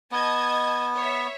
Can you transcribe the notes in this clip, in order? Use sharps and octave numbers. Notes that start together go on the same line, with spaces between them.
B3 D#5 A5 G#6
C#5 E5